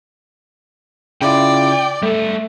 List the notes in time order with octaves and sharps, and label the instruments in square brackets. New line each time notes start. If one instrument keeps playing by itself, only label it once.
[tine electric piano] C#3 E4 F4 [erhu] D5 [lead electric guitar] G5
[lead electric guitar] G3 A4 [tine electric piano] A3